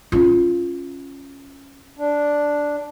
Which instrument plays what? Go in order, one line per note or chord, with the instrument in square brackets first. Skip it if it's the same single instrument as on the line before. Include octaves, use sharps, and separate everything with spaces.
[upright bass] C#4 F4
[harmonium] D4